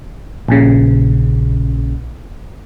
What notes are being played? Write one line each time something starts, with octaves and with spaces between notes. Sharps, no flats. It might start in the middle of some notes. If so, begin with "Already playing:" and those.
A#1 A#2 C#3